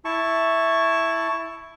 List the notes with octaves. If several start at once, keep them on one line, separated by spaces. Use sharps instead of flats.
E4 A5 C#6